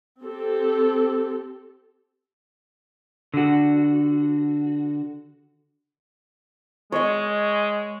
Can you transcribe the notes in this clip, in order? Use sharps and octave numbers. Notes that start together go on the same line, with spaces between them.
C4 G4 A4
D3 F#4
G#3 C#5 D#5